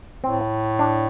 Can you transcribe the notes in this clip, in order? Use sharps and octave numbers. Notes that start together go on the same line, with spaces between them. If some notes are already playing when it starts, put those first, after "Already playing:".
A2 C4
D4